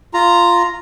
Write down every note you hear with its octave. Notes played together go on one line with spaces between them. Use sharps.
F4 A#5